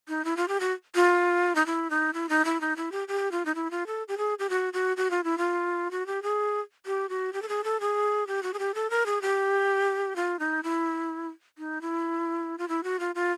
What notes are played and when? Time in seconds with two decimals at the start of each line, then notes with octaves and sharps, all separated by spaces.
0.09 D#4
0.25 E4
0.37 F4
0.48 G4
0.60 F#4
0.95 F4
1.55 D#4
1.66 E4
1.90 D#4
2.14 E4
2.29 D#4
2.45 E4
2.61 D#4
2.76 E4
2.92 G4
3.08 G4
3.32 F4
3.46 D#4
3.55 E4
3.71 F4
3.87 A4
4.08 G4
4.18 G#4
4.39 G4
4.50 F#4
4.73 F#4
4.97 F#4
5.11 F4
5.24 E4
5.38 F4
5.91 F#4
6.07 G4
6.23 G#4
6.86 G4
7.09 F#4
7.33 G4
7.42 A4
7.49 G#4
7.64 A4
7.81 G#4
8.27 G4
8.43 F#4
8.54 G#4
8.59 G4
8.75 A4
8.90 A#4
9.06 G#4
9.22 G4
10.16 F4
10.39 D#4
10.63 E4
11.58 D#4
11.81 E4
12.58 F4
12.68 E4
12.84 F#4
13.00 F4
13.15 F4